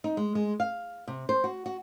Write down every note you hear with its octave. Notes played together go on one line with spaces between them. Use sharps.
D#4
G#3
G#3
F5
C3
C5
F#4
F#4